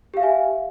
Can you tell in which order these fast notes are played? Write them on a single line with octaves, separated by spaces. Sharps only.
G4 F5 E5 G#5